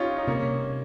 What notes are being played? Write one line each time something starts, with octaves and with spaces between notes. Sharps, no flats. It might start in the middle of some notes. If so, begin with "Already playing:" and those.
Already playing: C#4 D#4 F4 G4
D#4
C3 A#3 C#4